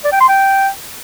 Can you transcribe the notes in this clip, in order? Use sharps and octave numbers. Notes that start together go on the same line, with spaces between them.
D5
G5
C6
G5